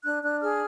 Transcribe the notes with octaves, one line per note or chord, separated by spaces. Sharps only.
D4 F#6
D4 F#6
G#4 F6